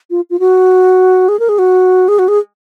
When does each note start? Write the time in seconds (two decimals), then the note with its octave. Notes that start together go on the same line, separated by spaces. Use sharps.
0.11 F4
0.30 F4
0.40 F#4
1.29 G#4
1.40 A#4
1.49 G#4
1.59 F#4
2.08 G#4
2.19 F#4
2.28 G#4